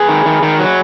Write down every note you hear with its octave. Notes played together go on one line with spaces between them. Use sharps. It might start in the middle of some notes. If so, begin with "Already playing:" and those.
Already playing: G#4 B4
D#3
D#3
D#3
F#3